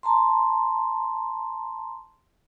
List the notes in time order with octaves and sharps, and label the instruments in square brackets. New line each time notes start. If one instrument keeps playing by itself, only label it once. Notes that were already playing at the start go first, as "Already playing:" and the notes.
[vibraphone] A5 A#5 C6